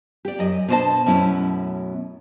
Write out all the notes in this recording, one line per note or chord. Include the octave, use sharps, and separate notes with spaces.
G4 D5
F#2 D#5
B2 D4 C5 C#5 D#5 A5
F#2 B2 A3 C#4 E4